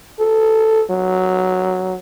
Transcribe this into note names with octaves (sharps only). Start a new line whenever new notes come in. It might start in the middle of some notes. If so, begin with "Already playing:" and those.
A4
F#3